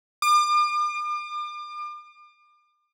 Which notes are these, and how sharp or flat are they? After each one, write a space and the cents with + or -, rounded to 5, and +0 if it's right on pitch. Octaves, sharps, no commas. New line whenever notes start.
D6 +40